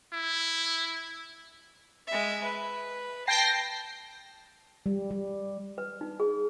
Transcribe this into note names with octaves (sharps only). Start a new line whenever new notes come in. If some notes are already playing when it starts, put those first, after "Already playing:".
E4
G#3 E5
B4
G5 A5 A#6 C7
G3
G3
B4
D#4
G#4